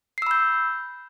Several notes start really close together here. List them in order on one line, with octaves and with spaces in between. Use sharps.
C7 E6 B5 G6